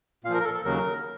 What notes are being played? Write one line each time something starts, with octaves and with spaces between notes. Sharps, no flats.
A#2 F3 A#4 F5
A#4
A4
A4
D#2 C#3 F#3 A#4